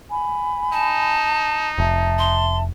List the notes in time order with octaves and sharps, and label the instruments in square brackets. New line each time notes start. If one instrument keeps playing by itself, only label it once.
[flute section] G#5 B5
[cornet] D#4 [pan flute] A5
[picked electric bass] F1 [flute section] E5 A5
[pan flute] C6